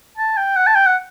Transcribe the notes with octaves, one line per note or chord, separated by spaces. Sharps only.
A5
G5
F#5
A5
G5
F#5